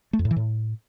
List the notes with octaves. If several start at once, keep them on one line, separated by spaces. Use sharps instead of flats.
A3
F2
A2
E3
A2